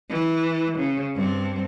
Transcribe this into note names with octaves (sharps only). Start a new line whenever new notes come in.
E3
C#3
G2 C4